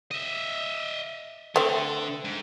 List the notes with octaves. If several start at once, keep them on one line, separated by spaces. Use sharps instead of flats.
D#5 E5
D3 A3 C4
G#2